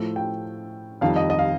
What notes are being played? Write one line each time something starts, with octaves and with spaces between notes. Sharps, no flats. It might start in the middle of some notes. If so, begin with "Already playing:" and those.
Already playing: A2 F3 A3
G5
F2 D#3 G3 F5
D#5
D#5
F5